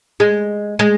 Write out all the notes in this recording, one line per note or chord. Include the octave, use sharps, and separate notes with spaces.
G#3
G#3